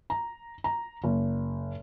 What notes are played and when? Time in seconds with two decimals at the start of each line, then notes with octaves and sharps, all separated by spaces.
0.10 A#5
0.64 A#5
1.04 F#1